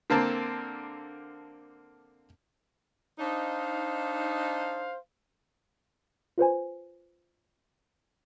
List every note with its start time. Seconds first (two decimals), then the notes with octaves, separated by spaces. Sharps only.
0.10 D3 A#3 C4 A5
3.19 D4 D#4 C5 F5
6.38 F4 B4 C5 G#5